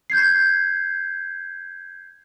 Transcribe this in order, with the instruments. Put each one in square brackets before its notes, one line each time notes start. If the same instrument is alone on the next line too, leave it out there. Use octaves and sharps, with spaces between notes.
[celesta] G6 G#6 C7